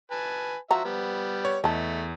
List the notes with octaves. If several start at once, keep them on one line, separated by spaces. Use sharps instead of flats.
B4 G#5 A5
F3 F#4 E5 F#5 A#5
G3 B3
C#5
E2 A3 D#5 A5